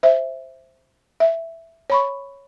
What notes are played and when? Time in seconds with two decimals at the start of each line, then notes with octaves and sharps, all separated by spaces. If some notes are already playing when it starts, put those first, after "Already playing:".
0.03 C5 E5
1.20 E5
1.90 C#5 B5 C#6